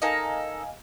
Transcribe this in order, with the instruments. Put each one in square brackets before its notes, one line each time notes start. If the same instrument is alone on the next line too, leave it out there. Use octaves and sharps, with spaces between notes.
[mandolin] D#4 A4 A#4 [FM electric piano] D#5 F5 G#5